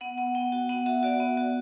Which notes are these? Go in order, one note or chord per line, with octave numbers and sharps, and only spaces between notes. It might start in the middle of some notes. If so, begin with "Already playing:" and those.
B3 F#5
B3 F#5
B3 G5
F#4 G5
B3 F#5
F#4 E5
F#4 D5
B3
F#4